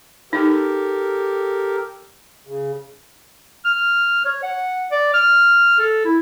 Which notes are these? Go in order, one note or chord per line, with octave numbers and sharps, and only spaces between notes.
D#4 G4 A4 A#4
C#3
F6
C#5
F#5
D5
F6
A4
E4